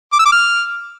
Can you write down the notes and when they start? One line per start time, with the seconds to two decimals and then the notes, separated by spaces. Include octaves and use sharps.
0.12 D6
0.19 E6
0.25 D6
0.32 F6